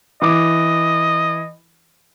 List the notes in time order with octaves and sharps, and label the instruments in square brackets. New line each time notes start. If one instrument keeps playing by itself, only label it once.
[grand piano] E3 D6 [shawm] D#5